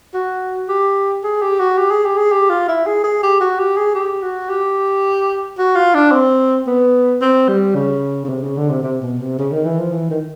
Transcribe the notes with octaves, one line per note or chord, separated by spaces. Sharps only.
F#4
G4
G#4
G4
F#4
G4
G#4
G4
G#4
G4
F4
E4
G#4
G#4
G4
F#4
G4
G#4
G4
F#4
G4
F#4
F4
D4
C4
B3
C4
G3
C#3
C#3
C3
C#3
D3
C3
C3
B2
C3
C#3
D#3
E3
F3
E3
D#3